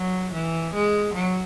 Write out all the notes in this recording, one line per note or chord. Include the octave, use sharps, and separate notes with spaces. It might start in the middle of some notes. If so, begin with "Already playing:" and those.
Already playing: F#3
E3
G#3
F#3